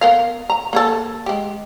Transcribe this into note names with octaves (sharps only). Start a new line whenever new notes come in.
B3 A#4 F5
A#5
A#3 G#4 A4
G#3 G4